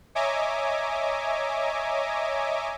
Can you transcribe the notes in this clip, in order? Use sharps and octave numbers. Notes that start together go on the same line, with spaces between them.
C#5 D#5 E5 G#5 A#5 D6